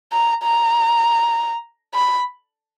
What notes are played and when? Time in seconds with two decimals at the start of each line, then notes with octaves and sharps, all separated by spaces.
0.13 A#5
0.43 A#5
1.95 B5